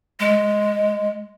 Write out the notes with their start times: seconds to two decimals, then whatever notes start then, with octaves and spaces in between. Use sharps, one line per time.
0.20 G#3